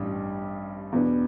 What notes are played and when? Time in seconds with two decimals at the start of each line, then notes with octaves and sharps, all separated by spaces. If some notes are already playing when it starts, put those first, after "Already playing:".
Already playing: A1 G2 G3 G4
0.92 E2 B2 B3 D4